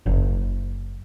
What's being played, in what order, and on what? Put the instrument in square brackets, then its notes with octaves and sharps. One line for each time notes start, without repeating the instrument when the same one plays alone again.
[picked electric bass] F#1